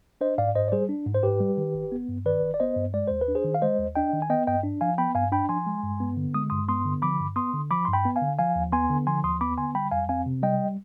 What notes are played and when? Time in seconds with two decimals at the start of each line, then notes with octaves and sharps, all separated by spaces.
0.21 D4 C5 D#5
0.38 G#2 D5 F5
0.55 G#2 C5 D#5
0.68 D5
0.72 G3 G#4 C5
0.89 D4
1.06 G#2
1.14 C5
1.23 G#2 G4 B4
1.41 G3
1.57 D#3
1.75 G1
1.92 B3
2.09 G2
2.26 D#3 B4 D5
2.42 G1
2.54 D5
2.60 B3 C5 D#5
2.76 G2
2.94 G#3 D5
3.08 D#2 C5
3.21 B4
3.28 D4
3.35 G#4 C5
3.45 D#3
3.55 F5
3.62 G#3 C5 D#5
3.78 D#2
3.95 D4 D#5 G5
4.13 D#3
4.22 G#5
4.30 B3 D#5 G5
4.47 G2 D#5 G5
4.64 D4
4.81 F3 F5 G#5
4.98 B3 G5 B5
5.15 G2 F5 G#5
5.32 D4 G5 B5
5.49 F3 G#5 C6
5.66 G#3
5.83 G2
6.00 B3
6.17 D3
6.34 G#3 D#6
6.50 G2 C6 D#6
6.68 B3 C6 D#6
6.85 D3
7.02 F3 B5 D6
7.20 G2
7.36 B3 C6 D#6
7.53 D3
7.71 F3 B5 D6
7.85 G2 C6
7.93 G5 B5
8.05 B3
8.16 F5 G#5
8.22 D3
8.39 F3 F5 G#5
8.56 D#2
8.72 B3 G#5 C6
8.90 D3
9.07 F3 G#5 C6
9.24 D#2 C6 D#6
9.41 B3 B5 D6
9.58 D3 G#5 C6
9.75 G3 G5 B5
9.91 F2 F5 G#5
10.09 C4 F5 G#5
10.26 C3
10.43 G3 D#5 G5